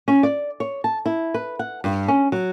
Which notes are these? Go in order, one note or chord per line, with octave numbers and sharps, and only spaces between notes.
C#4
D5
C#5
A5
E4
B4
F#5
G2
C#4
F#3